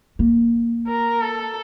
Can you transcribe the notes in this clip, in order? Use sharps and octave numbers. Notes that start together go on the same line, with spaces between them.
A#3
A#4
A4